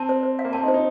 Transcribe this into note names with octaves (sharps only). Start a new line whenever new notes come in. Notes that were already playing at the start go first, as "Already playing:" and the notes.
Already playing: C4 A5
C5
C5
F5
A#3
C4 A5
D#4
C5
D#4